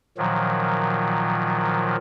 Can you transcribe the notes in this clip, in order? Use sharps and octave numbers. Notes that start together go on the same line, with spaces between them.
A#2 D#3 F3 F#3